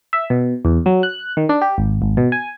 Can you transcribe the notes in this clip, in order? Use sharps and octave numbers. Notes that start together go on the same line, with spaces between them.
E5
B2
E2
F#3
F#6
D#3
D4
G4
G#1
G#1
B2
G#5